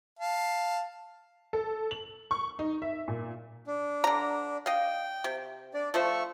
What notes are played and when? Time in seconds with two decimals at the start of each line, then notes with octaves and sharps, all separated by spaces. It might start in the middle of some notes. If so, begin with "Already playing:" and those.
0.19 F5 A5
1.53 A4
1.91 F#7
2.31 C#6
2.59 D#4
2.82 E5
3.08 A#2
3.67 D4
4.04 D3 A#5
4.66 D#5 F5 G5
5.24 C3
5.74 D4 D5
5.94 F3 A3 C5 C#6